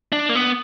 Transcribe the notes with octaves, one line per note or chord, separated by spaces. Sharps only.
D4
A#3
B3